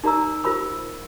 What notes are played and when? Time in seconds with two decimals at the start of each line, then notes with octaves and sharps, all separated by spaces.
0.04 D#4 A#4 D5 A#5 E6
0.44 F4 A#4 C5 B5 E6